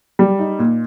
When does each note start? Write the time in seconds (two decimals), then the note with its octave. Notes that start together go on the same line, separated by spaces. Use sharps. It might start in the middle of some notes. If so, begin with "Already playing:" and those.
0.19 G3
0.39 D#4
0.59 A#2